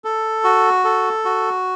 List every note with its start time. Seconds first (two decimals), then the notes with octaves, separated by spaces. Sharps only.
0.04 A4
0.44 F#4
0.84 A4
1.25 F#4